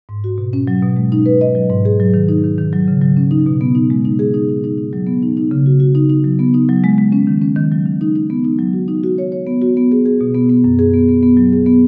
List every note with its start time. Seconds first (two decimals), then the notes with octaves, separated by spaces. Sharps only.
0.09 G#2
0.24 F#4
0.38 B2
0.53 C#4
0.67 F#3
0.82 B2
0.97 G#3
1.12 D#4
1.26 B4
1.41 D#5
1.55 F#3
1.70 G#2
1.85 G#4
2.00 F#3
2.14 D#3
2.29 D#4
2.44 D#3
2.58 D#3
2.73 F#3
2.88 C#3
3.02 F#3
3.17 C#4
3.31 D#4
3.47 B2
3.61 B3
3.75 D#4
3.90 G#3
4.05 D#4
4.19 G#4
4.34 D#4
4.49 D#4
4.64 D#4
4.78 D#4
4.93 F#3
5.07 B3
5.22 D#4
5.37 D#4
5.51 C#3
5.66 F#4
5.80 F#4
5.95 D#4
6.09 D#4
6.24 F#3
6.39 B3
6.54 D#4
6.69 F#3
6.84 G#3
6.98 G#3
7.12 C#4
7.27 D#3
7.42 C#4
7.56 D#3
7.72 F#3
7.86 D#3
8.01 D#4
8.15 D#4
8.30 B3
8.44 D#4
8.59 F#3
8.73 F#4
8.88 D#4
9.03 F#4
9.18 C#5
9.32 C#5
9.47 B3
9.62 F#4
9.77 B3
9.92 G#4
10.06 G#4
10.21 B2
10.35 B3
10.49 B3
10.64 F#2
10.79 G#4
10.94 B3
11.09 B3
11.23 B3
11.37 F#3
11.53 G#4
11.66 B3